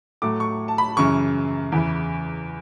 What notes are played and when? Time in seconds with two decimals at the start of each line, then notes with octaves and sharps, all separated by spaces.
0.22 A2 F#3 A3 D6
0.40 C#6
0.68 A5
0.78 B5
0.97 F#2 C#3 E3 C#6
1.72 E2 C#3 E3